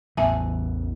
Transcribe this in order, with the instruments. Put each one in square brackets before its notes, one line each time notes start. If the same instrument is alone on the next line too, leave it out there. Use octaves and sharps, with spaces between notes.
[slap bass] A1 E2 E3 [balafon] E5 G#5 A5